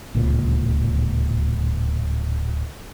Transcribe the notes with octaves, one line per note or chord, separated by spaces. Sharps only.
D1 C#2 A#2